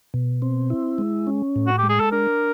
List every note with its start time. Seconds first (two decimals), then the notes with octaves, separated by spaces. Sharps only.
0.14 B2
0.42 C4
0.70 E4
0.98 G#3
1.27 C#4
1.56 A2
1.67 F#4
1.78 G#3 G4
1.89 G#4
2.00 A4
2.12 D4 A#4